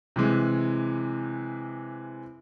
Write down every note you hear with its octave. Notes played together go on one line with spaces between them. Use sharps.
C3 E3 G#3